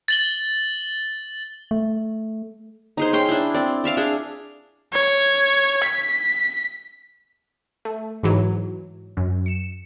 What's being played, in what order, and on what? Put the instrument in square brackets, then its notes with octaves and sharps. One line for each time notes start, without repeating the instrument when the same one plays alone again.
[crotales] A6 F#7 G7
[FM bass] A3
[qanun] D#4 G#4 C5
C#4 G#4 G5 C6
D4 E4
C4 D5
D5 E5 F5 D6
D4 G#4
[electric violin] C#5
B6
[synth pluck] A3
G#2 E3 F#3
F#2
C#7 E7